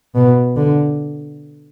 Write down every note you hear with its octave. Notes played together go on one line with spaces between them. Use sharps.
B2
D3